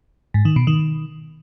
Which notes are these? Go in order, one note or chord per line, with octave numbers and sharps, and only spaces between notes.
G#2
D#3
B2
D#3